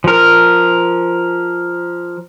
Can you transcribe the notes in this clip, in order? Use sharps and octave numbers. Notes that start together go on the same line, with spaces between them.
F3 A#4